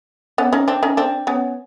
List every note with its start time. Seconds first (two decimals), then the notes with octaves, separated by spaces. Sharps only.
0.38 B3 C#4
0.53 C#4 D#4
0.68 C4 D4
0.83 C#4 D#4
0.97 C4 D4
1.27 B3 C#4